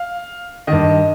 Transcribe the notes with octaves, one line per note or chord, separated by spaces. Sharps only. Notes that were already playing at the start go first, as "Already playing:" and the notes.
Already playing: F5
G2 D#3 D#5